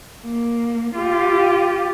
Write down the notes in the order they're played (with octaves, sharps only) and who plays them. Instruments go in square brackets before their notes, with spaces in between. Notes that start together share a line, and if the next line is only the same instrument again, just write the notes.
[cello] A#3
F4 G4